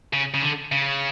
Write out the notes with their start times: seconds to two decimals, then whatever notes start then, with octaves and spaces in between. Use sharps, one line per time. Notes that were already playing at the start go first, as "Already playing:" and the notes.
0.13 C#3
0.34 C#3
0.42 D3
0.72 C#3